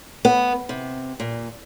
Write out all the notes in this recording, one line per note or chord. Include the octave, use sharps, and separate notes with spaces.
B3
C3
A#2